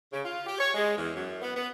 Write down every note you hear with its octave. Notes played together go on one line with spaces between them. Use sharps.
C#3
F4
G4
C#5
G#3
E2
F#2
B3
B3